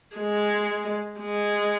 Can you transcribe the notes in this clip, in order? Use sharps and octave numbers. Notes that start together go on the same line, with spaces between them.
G#3
G#3